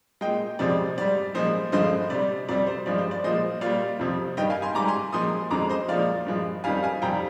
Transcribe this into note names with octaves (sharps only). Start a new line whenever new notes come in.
A#2 G#3 D#5 G5
F2 C3 F3 G#3 D5
G#2 G3 D5
A#2 F3 G#3 C5 D#5
G2 D3 F3 G#3 C5 D#5
C3 G3 D5
F2 C3 G3 D5
C5
G2 F3 G#3 D5
C5
D5
A#2 F3 G#3 C5 D#5
A#2 G3 D5 F5
F2 C3 F3
G2 D#3 G3 D#5 G5
F5 G#5
G#5 C6
G#2 G3 A#5 D6
G#5 C6
A#2 F3 G#3 C6 D#6
F2 D3 G#3 A#5 D6
C5 D#5
A#2 F3 G#3 D5 F5
G2 F3 G#3
F2 D#3 G3 F5 G#5
F5 G#5
F2 C3 G3 G5 A#5